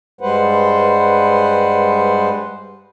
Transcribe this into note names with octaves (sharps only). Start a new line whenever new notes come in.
G2 G3 G#3 B4 C5 F#5